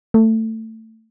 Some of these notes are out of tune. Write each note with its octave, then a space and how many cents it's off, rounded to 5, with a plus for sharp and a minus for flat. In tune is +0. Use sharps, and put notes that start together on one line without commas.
A3 +20